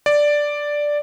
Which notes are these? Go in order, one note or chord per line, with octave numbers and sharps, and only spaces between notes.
D5